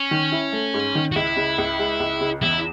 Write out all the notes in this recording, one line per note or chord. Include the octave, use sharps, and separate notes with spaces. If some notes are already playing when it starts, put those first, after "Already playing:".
Already playing: C#4
D#3
E4
A3
G#2
D#3
F#4
C#2 E4
C#3
C#2
G#3
C#2
C#3
E2 E4